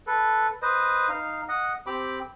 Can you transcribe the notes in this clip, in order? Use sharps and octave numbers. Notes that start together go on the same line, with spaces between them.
A4 B4
B4 C5 D#5
D#4 F5
D#5 F#5
C4 G4 B5 D6